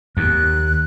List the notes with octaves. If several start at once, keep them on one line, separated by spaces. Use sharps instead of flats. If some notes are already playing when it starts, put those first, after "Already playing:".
D#2 F#6